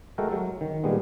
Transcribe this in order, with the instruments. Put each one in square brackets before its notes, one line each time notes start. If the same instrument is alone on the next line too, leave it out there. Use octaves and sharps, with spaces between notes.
[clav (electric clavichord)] G#3 A3 F#4 A4 A#4 G5
F#3
D#3
A#2 G3 G#3 B3